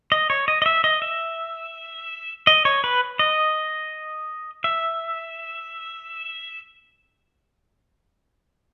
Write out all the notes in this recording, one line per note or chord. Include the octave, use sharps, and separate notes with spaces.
D#5
C#5
D#5
D#5
E5
D#5
E5
D#5
C#5
B4
D#5
E5